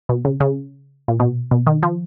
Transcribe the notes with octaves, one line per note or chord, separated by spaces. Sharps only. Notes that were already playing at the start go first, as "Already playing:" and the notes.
B2
C#3
C#3
A#2
B2
B2
D#3
F3